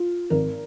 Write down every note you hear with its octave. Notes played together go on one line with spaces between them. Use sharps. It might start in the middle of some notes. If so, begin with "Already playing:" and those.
Already playing: F4
G#1 A#4